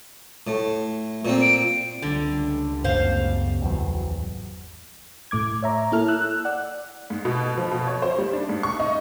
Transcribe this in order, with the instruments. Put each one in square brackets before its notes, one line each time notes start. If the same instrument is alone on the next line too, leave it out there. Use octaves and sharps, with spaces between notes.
[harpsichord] A2
A#2 C4
[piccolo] D7
[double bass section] C#2 G3 A3 [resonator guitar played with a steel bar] D3
[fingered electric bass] F#2 C#3 B3 [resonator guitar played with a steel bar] C5 F5
[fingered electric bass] G#1 E2 F#3
[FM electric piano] A2 A3 D6 G#6
C#5 E5 A#5
A#3 E4 A4 F6
E6 F#6
D5 F#5
[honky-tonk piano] G#2
B2
F3
B2
C#5
C5
G3
D4
G#2
C#6
D#4